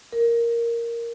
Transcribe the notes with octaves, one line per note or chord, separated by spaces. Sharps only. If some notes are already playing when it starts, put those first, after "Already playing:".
A#4